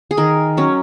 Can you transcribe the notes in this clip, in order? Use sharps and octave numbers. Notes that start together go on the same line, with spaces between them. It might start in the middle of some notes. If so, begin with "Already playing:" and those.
G#4
D#3 A#4
F#3 C#4